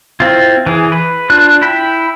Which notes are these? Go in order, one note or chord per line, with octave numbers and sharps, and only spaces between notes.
C4 E4 F4
E3 G#4
B4
D4 F4 F#6
E4 G5 B5